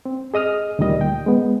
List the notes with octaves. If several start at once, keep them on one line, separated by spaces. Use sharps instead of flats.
C4
G#4 D#5 D#6 F6
D2 A#2 D#3 G3 D#5
G5
G#3 B3